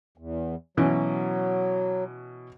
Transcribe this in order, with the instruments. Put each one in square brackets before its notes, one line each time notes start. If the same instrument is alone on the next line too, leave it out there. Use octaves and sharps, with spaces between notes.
[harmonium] E2
[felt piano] B2 E3 C#4 [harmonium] F#3